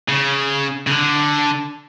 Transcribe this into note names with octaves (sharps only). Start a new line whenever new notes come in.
C#3
C#3
D3